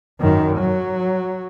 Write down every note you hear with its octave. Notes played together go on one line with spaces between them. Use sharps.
F#2 D#3
F#3